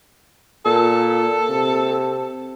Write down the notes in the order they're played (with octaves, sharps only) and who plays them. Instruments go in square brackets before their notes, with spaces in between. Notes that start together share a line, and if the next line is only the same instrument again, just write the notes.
[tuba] A#2 [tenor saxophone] A4
[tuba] C3